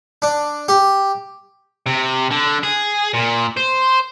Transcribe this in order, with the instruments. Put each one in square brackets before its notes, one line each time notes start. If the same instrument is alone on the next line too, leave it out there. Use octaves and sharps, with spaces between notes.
[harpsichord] D4
G4
[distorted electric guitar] C3
D3
G#4
A#2
C5